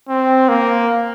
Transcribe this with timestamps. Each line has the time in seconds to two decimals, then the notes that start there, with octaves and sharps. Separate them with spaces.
0.09 C4
0.49 A#3